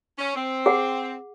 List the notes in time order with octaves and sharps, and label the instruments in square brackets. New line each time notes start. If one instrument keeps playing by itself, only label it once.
[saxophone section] C#4
C4
[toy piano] G#4 F#5